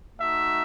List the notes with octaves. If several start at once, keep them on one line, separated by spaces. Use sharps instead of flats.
A3 D#4 F#4 E5